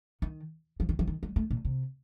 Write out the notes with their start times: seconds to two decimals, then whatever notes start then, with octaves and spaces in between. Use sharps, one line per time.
0.22 D#3
0.80 F3
0.89 D#3
0.99 F3
1.07 D#3
1.23 G3
1.36 A3
1.51 A#2
1.65 C3